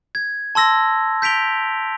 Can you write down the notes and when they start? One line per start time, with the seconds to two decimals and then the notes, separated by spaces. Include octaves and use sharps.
0.15 G#6
0.55 A5 C6 E6 A#6
1.22 G6 B6 D7 F7 G7